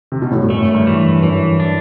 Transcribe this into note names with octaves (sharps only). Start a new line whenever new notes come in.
C3
B2
A2
G2
F#2 A3
G2
E3
G2
F#2 E3
D4